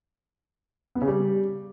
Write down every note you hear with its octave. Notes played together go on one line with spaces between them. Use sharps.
B3
C#3
G3